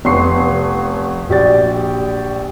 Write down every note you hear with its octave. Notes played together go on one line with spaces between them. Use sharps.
F1 B3 C6 C#6 C7
A#1 F#4 G4 D5 A6